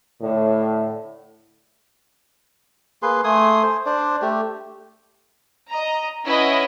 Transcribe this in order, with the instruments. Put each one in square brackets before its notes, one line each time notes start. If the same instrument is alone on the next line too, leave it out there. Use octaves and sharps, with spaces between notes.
[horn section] A2 D3
[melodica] A#3 G#4 B4 C6
A3 G#5 C6 D#6
C5
D4 C5 D5
A3 G4
[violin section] D#5 A#5
C#4 E4 B4 D#5 F#5